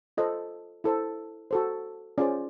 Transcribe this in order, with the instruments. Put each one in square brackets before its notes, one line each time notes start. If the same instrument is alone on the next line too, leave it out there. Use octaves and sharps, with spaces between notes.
[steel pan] F4 A4 C5 D#5
E4 A4 C5
F#4 A4 C5
C#4 F4 G#4 C5 D5